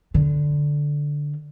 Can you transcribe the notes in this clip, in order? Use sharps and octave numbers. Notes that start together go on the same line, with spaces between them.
D3